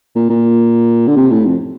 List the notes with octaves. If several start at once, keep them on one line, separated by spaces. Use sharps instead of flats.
A#2
A#2
D3
C3
A2
F2